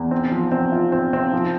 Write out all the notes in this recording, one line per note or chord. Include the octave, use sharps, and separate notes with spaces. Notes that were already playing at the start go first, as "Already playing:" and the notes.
Already playing: E2
C4
F3
C4
F4
C4
C4
F3